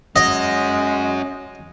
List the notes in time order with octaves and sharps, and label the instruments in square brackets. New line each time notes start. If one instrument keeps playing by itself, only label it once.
[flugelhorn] G#3 [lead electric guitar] C#4 F#4 [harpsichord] D#5